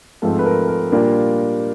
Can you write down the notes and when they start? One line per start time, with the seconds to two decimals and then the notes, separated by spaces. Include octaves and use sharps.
0.22 G#2 F3 A3 C4 A4
0.39 B4
0.46 A#4
0.68 A#4
0.92 A#2 G3 A#3 D4 F4